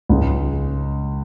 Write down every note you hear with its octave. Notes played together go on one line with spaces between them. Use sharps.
C#2 C#3 G#3